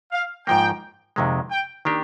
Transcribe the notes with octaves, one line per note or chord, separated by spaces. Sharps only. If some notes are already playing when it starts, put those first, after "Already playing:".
F5
G#2 F3 A#3 G5
F2 C3 D#3 G#3
G5
D#3 A#3 D4 G4